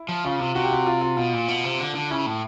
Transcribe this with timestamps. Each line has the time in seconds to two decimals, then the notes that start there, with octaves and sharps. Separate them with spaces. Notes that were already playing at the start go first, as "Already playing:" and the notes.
Already playing: E4
0.09 F3
0.24 C#3 F4
0.40 C3 F4
0.55 C3 F#4
0.64 G4
0.72 F#4
0.86 F4
1.01 F4
1.17 B2 F4
1.33 A#2
1.48 B2
1.64 C3
1.79 D3
1.95 D3
2.11 C#3 E4
2.26 A2